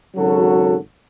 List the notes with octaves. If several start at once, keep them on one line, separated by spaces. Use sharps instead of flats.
G#1 C#3 F#3 F#4 A4